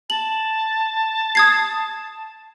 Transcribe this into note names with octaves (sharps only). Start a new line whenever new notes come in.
A5 F#7
D#6 G#6 C7